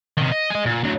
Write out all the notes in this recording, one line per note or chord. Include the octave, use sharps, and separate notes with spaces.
C3 D#3
D#5
G#4 D#5
A#2
D2 F#3